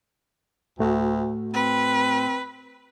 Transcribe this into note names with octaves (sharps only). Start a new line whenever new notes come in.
D2 A2 A3 F#4
C4 B4